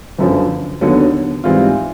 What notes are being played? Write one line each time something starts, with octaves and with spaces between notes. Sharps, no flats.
G1 F#2 D3 F3
D#2 D3 F#3 B3
G#2 E3 G3 C4 F4